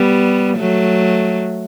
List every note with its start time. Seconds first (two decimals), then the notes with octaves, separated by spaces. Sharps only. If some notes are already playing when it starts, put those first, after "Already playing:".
Already playing: G3 B3
0.58 F#3 A3